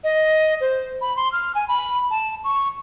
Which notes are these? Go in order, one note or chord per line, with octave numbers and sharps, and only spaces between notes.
D#5
C5
B5
C6
F6
G#5
B5
A5
C#6